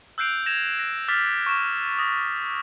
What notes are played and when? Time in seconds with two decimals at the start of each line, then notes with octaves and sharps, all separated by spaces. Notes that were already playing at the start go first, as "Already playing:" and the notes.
0.18 E6 F#6 G6 C7 D7 F7
0.46 G6 G#6 A#6 E7 F7
0.79 A#6
1.08 D6 F6 A6 B6 F7
1.46 C#6 E7
1.99 D#6 A#6